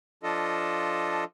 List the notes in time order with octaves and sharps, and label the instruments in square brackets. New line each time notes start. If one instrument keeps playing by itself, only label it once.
[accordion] F3 D4 F4 A4 D#5